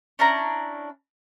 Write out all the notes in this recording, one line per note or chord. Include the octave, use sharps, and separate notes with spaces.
C#4 D4 E4 A#5